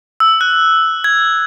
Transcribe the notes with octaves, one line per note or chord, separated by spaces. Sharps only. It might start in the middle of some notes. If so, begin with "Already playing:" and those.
E6
F#6
G#6